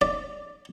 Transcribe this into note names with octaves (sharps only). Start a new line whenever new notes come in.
D5